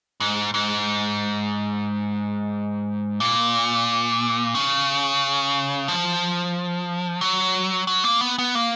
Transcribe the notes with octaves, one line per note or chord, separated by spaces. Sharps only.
G#2
G#2
A#2
C#3
F3
F#3
F#3
A#3
B3
B3
A#3